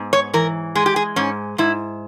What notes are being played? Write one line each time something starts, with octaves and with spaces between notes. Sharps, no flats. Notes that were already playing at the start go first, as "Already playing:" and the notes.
Already playing: G#2 B3
C#5
E3 A#4
G#3 G#4
G4
G#4
G#2 C#4
G#2 E4